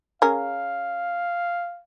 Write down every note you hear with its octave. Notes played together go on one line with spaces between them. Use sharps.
C#4 G#4 A#4 F5